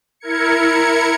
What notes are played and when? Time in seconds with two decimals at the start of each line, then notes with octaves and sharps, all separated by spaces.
0.20 E4 A#4 G#6 C#7